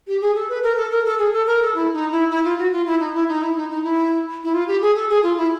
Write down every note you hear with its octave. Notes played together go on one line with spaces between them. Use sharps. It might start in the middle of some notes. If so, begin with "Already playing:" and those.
G4
G#4
A4
B4
A#4
A4
A#4
A4
G#4
A4
A#4
A4
E4
D#4
E4
E4
F4
F#4
F4
E4
D#4
E4
D#4
E4
D#4
D#4
E4
E4
F4
G4
G#4
A4
G#4
F4
E4